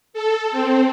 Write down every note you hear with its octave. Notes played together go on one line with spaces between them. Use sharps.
A4
C4